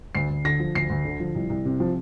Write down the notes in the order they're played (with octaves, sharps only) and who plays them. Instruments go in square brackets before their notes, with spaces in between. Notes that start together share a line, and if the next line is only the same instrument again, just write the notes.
[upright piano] D2 C7
D2
D3 A#6
F3
D2 C7
D2
D3
F3
C2
C2
C3
F3